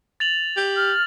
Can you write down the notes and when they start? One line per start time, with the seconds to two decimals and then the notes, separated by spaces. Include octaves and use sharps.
0.20 A6 F7 F#7
0.57 G4
0.77 F6